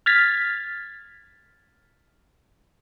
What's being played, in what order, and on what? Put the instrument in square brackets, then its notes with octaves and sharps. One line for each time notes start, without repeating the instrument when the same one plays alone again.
[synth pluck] F6 G#6 A6 B6